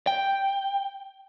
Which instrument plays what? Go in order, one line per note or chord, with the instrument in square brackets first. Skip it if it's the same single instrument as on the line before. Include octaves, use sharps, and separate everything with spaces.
[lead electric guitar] G5